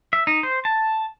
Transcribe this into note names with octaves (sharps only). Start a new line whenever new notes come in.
E5
D#4
C5
A5